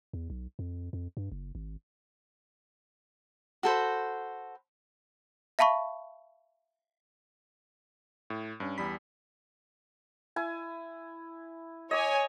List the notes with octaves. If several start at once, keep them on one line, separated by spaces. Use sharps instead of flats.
E2
B1
F2
F2
G2
F#1
G#1
F#4 A4 C5 B5
E5 F5 A5 B5 C#6
A2
G2 C#4
E2 G3 B5 B6
E4 G#5
C#5 D#5 G#5 D6